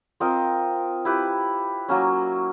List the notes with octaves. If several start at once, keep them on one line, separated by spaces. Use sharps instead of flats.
C4 F4 A#4 D#5
E4 G4 B4
F#3 A#3 C#4